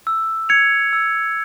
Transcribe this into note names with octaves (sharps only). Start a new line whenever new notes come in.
E6
G#6 C#7 F7
E6